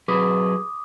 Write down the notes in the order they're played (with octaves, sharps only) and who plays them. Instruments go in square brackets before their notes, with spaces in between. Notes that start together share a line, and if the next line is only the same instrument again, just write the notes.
[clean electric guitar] F#3 G#4 B4 [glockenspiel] D6 D#6